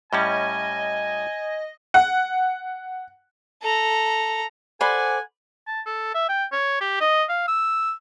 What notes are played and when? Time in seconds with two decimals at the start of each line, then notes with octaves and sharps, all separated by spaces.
0.13 A2 G3 C#4 D#5 G#5
1.94 F#5
3.63 A4 A#5
4.81 A4 C5 D5 F#5 G#5 B5
5.67 A5
5.86 A4
6.14 E5
6.29 G5
6.52 C#5
6.81 G4
7.00 D#5
7.29 F5
7.48 E6